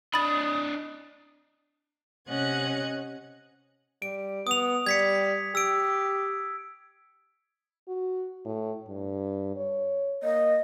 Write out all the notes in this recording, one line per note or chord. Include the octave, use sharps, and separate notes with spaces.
D4 D#5 B5 D#6 A6
C3 C#4 D#5 F#5 F#6 G#6
G3 D7
B3 D#6 F7
G3 G#6 B6 C#7
G4 E6 D7
F#4
A2
G2
C#5
A#3 D#5